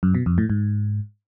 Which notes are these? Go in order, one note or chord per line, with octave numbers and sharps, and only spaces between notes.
F#2
B2
F2
A2
G#2